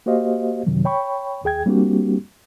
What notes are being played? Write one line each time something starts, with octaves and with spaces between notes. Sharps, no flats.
A#3 F#4 G4 C5 D#5 F5
F#2 C3 D#3 F#3
C#5 G5 B5 C#6
D#2 G#4 G5 G#6
G3 A#3 C4 D4 F#4 G4